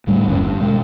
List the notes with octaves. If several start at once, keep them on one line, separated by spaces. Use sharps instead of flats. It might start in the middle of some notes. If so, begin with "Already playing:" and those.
D2 A2 G3 A3
G1 D#2 C#4
G2
B2 G#3